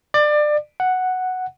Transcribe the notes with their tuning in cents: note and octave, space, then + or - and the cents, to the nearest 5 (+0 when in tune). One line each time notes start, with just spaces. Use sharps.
D5 +25
F#5 +0